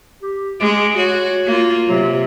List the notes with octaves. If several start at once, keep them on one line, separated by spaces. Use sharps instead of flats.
G4
G#3 D6
F#4 C#5
A#3 F4
C3 F#3